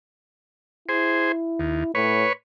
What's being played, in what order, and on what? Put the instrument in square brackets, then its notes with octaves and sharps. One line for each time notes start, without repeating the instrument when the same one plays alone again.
[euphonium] E4 [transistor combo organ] G#4 C5
[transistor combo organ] D#2
[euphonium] A2 [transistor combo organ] B4 C#5